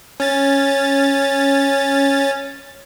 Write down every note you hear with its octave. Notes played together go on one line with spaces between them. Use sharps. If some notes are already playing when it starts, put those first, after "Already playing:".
C#4 A6